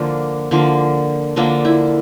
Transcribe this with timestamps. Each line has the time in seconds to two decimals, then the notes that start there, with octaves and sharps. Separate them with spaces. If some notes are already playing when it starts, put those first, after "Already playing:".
Already playing: D3 F3 A#3 D4
0.51 D3 F3 A#3
1.36 D3 F3 A#3 D4
1.65 E4